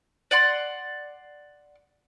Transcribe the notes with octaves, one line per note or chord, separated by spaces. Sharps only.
D5 F#5 C6